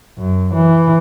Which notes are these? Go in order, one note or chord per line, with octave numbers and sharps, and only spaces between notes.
F#2
E3